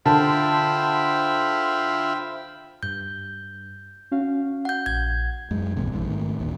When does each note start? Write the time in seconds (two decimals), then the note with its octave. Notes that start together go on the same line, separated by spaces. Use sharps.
0.06 D3 F4 C5 E5 G5 A5 B5
2.83 G2 G6
4.11 C#4 F#4 F5
4.65 F#5 G6
4.86 A#1 G#6
5.51 F#2 G#3
5.76 A#1 E2 G#2 C3
5.92 A#1 G2 E3
6.06 G#2 D#3 A3
6.39 G1 D#2 A#2